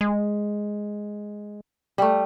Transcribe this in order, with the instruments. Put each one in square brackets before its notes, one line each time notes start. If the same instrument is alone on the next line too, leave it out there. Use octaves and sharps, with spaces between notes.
[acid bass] G#3
[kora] G3 A3